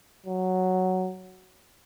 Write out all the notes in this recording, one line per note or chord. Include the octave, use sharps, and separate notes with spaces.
F#3